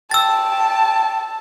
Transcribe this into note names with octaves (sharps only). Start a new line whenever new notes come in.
G5 A5 E6 A6